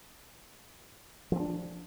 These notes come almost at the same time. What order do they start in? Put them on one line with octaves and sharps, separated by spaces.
F3 C4 D4